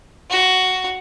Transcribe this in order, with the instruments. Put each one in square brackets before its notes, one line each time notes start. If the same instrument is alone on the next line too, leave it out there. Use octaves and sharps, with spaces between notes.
[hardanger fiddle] F#4